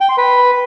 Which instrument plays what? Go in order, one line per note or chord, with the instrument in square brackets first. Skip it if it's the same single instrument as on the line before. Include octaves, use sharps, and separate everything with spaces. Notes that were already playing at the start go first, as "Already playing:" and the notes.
[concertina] G5
C6
B4